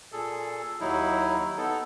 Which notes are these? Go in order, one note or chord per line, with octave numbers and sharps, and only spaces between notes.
A#2 G#4 A4
D#2 F#3 D#4 E4
B3 D#4 A4